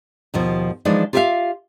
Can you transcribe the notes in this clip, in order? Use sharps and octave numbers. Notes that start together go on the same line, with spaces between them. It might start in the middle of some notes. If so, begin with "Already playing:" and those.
D#2 B2 F3
E3 F3 G#3 D4 D#4
F4 G4 A#4 D5 E5 F5